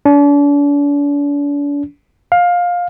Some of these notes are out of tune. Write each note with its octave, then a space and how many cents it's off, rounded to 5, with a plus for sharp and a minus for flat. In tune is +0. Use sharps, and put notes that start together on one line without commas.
D4 -40
F5 +15